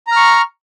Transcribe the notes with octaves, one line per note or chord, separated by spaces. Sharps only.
A#5 C#6 F6